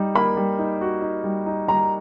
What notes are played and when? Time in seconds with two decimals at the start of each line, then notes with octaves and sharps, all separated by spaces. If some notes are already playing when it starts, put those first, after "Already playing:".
Already playing: G3 D#4
0.15 A#3 B5
0.37 G3
0.59 D#4
0.81 F#4
1.02 D#4
1.24 G3
1.46 D#4
1.68 G3 A#5